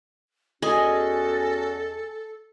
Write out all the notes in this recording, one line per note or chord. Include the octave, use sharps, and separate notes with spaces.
E2 C#4 F#4 G#4 A4 D#5 G#5